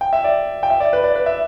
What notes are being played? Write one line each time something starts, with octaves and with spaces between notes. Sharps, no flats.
G5
E5
D5
G5
E5
D5
B4
D5
B4
E5